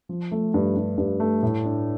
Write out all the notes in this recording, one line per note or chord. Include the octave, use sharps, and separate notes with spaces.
F3
A3
G2
G2
G2
A3
A2
D4